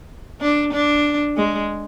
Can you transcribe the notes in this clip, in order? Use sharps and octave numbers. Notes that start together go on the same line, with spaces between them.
D4
D4
G#3